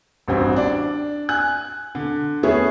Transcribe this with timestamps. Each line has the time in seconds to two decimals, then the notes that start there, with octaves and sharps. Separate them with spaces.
0.28 A1 G2 C4 F#4
0.56 D4 D5
1.29 G#5 F#6
1.95 D3
2.43 A3 B3 C#4 E4 G#4